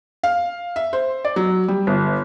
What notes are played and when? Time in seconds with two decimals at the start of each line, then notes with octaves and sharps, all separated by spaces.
0.23 F5
0.76 E5
0.93 C5
1.25 D5
1.36 F#3
1.68 G3
1.87 G1